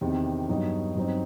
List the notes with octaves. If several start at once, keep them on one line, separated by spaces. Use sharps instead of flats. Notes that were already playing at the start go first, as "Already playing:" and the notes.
E2 C3 D#3
G2 F#3 B3 D#4
G2 F#3 C4 D#4